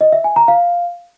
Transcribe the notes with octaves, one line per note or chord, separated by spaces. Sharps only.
D#5
E5
G#5
A#5
F5